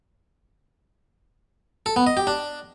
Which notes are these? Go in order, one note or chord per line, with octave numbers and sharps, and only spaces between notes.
A4
B3
D#5
G4
D4